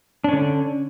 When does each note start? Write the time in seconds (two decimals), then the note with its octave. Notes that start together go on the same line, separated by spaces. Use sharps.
0.24 D4
0.29 C#4
0.33 D3